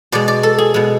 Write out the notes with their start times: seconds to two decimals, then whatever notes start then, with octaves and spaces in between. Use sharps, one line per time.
0.12 B2 G#3 D5
0.28 D5
0.43 A4
0.58 G#4
0.74 B2 G#3